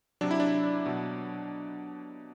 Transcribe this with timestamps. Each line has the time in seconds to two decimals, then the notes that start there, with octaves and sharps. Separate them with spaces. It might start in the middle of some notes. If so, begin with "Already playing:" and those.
0.21 C3 F#3 D4
0.31 E4
0.40 D4
0.86 B2 F#3